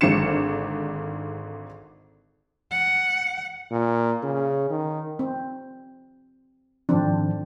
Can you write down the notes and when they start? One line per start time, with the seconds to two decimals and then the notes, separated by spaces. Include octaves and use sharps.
0.01 G#1 G#2 D3 C#7 E7
2.71 F#5
3.72 A#2
4.23 C#3
4.70 D#3
5.19 C4
6.89 G#2 D#3 F3 C4 D4